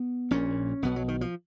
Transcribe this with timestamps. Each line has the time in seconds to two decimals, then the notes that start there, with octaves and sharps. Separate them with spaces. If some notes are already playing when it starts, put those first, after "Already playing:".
Already playing: B3
0.31 A#1 A#2 C#4
0.82 B1 B2 B3
0.96 F#3
1.08 D#3
1.21 F3